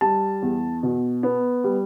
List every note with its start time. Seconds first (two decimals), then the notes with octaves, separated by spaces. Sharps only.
0.01 G3 A5
0.42 E2
0.83 B2
1.23 B3
1.64 G3